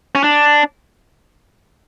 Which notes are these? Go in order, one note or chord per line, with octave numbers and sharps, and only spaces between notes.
C#4
D4